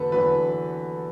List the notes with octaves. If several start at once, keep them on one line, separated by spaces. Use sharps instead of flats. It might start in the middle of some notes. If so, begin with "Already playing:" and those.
Already playing: E2 D3 F#3 A4 B4
E2 D3 F#3 B4